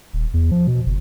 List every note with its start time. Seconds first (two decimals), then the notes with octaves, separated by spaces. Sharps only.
0.13 D#1
0.34 E2
0.51 F3
0.67 B2
0.86 F#1